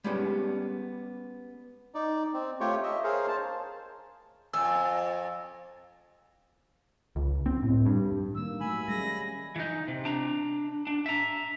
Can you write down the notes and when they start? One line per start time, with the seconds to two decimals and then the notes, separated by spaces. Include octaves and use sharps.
0.04 G3 G#3 B3 C#4 G4
1.95 D#4 D5
2.34 C4
2.60 A3 F4 G4 C#5 G5 C#6
2.83 D#5 E5
3.04 G#4 A#4 C5 C#5 F5
3.28 C5 A5
4.53 F2 G#5 E6
7.16 C#2
7.46 C4
7.63 A2
7.86 G2
8.35 D#3 A#3 E6
8.60 F#3 A3 G#5 B5
8.87 G3 G#3 C#4 A#6
9.56 E3 D#4
9.88 C3
10.05 D4 A#5
10.87 D4
11.06 E5 A#5